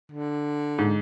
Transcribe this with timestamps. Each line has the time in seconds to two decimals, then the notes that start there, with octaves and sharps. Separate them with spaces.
0.12 D3
0.78 G#2